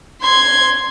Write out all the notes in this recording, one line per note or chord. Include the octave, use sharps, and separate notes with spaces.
C6 G#6